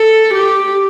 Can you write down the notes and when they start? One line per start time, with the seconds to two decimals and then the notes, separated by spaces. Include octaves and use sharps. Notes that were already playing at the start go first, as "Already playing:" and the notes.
Already playing: A4
0.34 G4